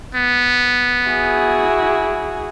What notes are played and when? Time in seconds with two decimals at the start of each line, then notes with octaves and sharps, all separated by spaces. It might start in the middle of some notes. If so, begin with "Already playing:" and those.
0.15 B3
1.06 E4 F#4 G#4